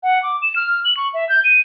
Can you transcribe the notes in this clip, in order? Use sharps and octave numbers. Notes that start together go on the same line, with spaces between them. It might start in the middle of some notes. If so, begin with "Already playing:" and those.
F#5
D6
E7
F6
F#7
C#6
E5
G6
D#7